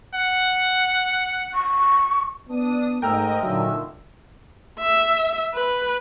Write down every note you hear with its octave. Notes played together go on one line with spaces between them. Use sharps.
F#5
C#6
B3 D4 D#6
G#2 A3 A#4 D#5 G5 A#5 E6
A#2 D3 D#3 F#3 E5
E5
B4